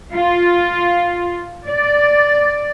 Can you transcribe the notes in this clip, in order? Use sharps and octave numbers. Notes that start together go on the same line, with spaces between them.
F4
D5